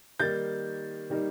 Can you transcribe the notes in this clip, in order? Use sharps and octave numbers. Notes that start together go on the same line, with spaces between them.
D#3 G3 A#3 D#4 G6 A6
D#3 G3 A#3 D#4